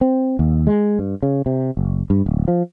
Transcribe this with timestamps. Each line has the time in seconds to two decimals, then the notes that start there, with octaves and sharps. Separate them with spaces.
0.01 C4
0.39 D#2
0.67 G#3
0.99 G2
1.23 C#3
1.46 C3
1.77 F#1
2.10 G2
2.26 D1
2.48 F3